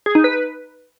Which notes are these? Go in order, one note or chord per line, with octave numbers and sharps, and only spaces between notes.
G#4
D#4
B4